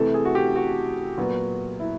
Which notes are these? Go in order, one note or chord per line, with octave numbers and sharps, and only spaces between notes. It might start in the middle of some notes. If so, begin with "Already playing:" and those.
Already playing: C3 E3 A3 A4
G#4
F#4
G4
F#4
A#2 F#3 B3
E4